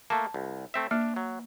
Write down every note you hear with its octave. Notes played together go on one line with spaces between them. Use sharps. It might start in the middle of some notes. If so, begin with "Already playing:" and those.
A3 A#3 A5
C2
A3 C4 E5
A#3 D4
F#3